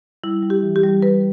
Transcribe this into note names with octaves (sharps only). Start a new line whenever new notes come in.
G3 E4
G3
G4
E3
G4
G3
G3 B4